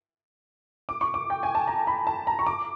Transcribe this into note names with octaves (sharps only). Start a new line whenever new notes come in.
D6
C#6
D6
G5
G#5
A5
A#5
B5
A5
A#5
C#6
D6